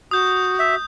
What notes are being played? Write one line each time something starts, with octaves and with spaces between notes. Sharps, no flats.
F#4 D#6 G6
E5